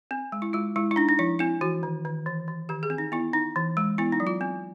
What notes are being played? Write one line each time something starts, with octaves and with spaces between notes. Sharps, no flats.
C4
G#3
E4
G#3 F4
G#3 E4
E4
D4 D#4
D#4
F3 E4
C4 E4
E3 F#4
D#3
D#3
E3
E3
D#3 G4
G#4
C4
D#4
B3 E4
D#4
E3
G#3
B3 E4
D#4
F#3
F4
C4